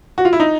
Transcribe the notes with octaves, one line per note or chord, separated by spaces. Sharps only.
F#4
F4
E4
D#4